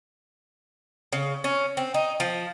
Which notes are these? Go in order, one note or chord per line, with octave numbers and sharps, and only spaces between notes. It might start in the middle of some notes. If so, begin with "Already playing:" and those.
C#3
C#4
C4
D#4
F3